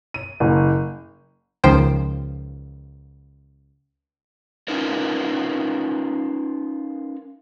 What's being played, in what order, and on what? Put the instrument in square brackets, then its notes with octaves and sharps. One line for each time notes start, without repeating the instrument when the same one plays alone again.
[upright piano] D#7
F#1
[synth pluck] C#2 D#3 F3 C5 G5
[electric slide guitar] C#4 D#4 F4 A#4 B4